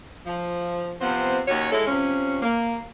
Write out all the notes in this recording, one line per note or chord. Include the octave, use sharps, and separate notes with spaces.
F3
C3 F3 B3 C4
D#2 C#4 F#4 C#5
G#3 E4 A4
C3 F3 C#4
A#3